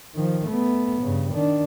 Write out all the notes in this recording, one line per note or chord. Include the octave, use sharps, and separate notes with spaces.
D#3 F3
A3 B3
G2 C#3
D#3 D4